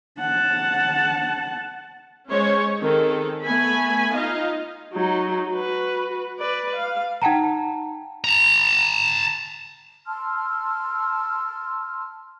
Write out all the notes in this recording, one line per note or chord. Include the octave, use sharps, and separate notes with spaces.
F#5 A5
G#3 C#4 C5 C#5
D#3 C4 G#4 A4
A3 B3 G#5 B5
D#4 F4 D#5 F5
F#3 D#4
F#4 B4
B4 D5
F5
D#4 F#5 G5 A5 A#5
A5 A#5
A5 C6 E6 F6